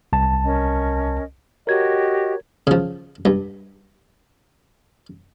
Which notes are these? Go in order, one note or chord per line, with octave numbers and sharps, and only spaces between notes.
C2 A5
C#4 A#4 D#5
F#4 G4 A#4 C#5 D#5 G#6
C#3 F3
G2